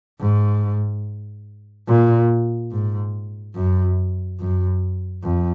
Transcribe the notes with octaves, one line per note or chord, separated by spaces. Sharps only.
G#2
A#2
G#2
F#2
F#2
F2